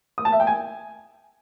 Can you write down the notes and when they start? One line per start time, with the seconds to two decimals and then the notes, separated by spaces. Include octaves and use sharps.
0.18 D#6
0.25 A5
0.32 E5
0.40 G5
0.47 G#5